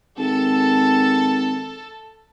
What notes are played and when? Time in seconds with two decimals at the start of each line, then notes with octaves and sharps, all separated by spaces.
0.17 G#1 A4